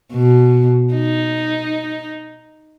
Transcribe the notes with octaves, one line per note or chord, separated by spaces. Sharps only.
B2
D#4